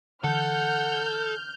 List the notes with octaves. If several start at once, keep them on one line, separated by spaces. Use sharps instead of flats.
D3 E3 A4 F#5 F6 G6